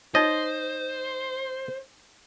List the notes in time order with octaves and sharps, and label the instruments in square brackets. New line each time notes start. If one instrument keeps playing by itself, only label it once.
[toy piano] D#4 C#5 [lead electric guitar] C5 [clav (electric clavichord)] D#5